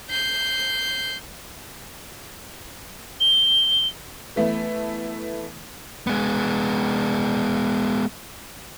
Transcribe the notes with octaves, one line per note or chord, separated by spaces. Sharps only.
G6 C7
G7
E3 A3 B3 E4
G#3 B3